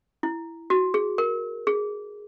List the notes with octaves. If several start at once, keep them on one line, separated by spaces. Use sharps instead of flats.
E4
F#4
G#4
A#4
G#4